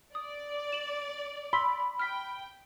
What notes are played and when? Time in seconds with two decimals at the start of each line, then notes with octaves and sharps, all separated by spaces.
0.15 D5 D#6
0.72 E7 F#7
1.53 B5 C6 E6 B6
1.99 G5 F6 B6